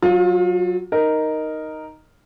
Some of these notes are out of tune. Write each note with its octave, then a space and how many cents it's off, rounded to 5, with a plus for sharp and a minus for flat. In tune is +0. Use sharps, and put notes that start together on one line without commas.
F#3 +0 F4 +30
D#4 +0 A#4 +0